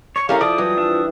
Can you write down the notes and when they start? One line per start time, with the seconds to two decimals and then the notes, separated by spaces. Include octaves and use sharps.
0.16 C#5 C#6
0.29 G3 C#4 E4 A4 A#4 F5
0.41 F3 D5 D#6
0.58 E3 F#3 G3
0.77 D4 E5